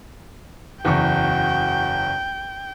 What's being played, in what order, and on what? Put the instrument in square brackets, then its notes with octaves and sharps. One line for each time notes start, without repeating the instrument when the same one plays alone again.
[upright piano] F#1 E2 C#6 [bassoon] F#4 [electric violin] G5